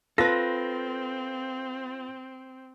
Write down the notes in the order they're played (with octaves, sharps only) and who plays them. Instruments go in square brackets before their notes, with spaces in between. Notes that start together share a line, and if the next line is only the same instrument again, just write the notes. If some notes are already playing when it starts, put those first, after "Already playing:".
[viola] C4 [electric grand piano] F4 [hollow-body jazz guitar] A4 B4 [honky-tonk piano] A#6